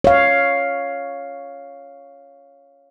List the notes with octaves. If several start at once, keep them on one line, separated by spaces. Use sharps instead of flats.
C#5 F5